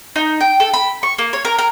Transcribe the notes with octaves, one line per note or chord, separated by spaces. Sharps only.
D#4
G5
A4
B5
C#6
A#3
C#5
A#4
A#4